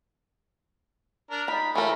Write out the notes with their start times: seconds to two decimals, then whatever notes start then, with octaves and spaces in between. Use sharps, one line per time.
1.30 D4 A#4
1.48 D#4 B5
1.75 E3 A3 A#4